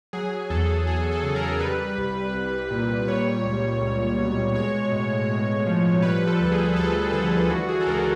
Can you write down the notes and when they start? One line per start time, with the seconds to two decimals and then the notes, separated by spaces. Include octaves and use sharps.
0.13 F#3 G#4
0.50 E2 A4
0.87 E2 G#4
1.11 A4
1.23 C#3
1.36 A#4
1.60 G3 B4
1.98 C2
2.34 C2
2.71 A#2
3.08 G3 C#5
3.45 C#2
3.81 C#2
4.19 B2
4.55 G#3 C#5
4.92 A2
5.29 A2
5.66 F3
6.02 G3 B4
6.27 A4
6.40 D2
6.52 G#4
6.76 D2 A4
7.13 D3 A4
7.50 E3 F#4
7.69 G#4
7.81 A4
7.87 C#2 A#4